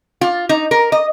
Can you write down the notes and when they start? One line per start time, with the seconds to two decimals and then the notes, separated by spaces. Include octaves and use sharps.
0.21 F4
0.49 D#4
0.71 A#4
0.92 D#5